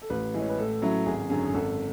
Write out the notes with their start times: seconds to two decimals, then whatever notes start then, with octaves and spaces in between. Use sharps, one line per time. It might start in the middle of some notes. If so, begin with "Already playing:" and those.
0.02 A4
0.10 A1 B4
0.34 A2 E3 G#3
0.40 C#5
0.49 B4
0.58 A2 A4
0.82 F#3 C#4 E4
1.06 G#1 G#4
1.30 F#2 D3 F#3 C#4 G#4
1.44 G#4
1.54 G#1 A4